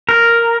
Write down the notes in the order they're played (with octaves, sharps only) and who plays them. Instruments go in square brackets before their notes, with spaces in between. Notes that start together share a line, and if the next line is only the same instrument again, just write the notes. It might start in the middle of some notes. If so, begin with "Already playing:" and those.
[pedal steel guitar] A#4